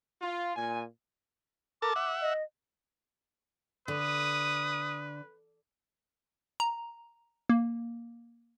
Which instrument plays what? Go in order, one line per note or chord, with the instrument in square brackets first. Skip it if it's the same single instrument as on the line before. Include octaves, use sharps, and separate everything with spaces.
[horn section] F4
A#2 G#5
[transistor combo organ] A4 A#4 A5 [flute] D6
[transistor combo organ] E5 F#5
[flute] D#5
[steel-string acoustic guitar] D3 [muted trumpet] B4 [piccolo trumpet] D#6
[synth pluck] A#5
A#3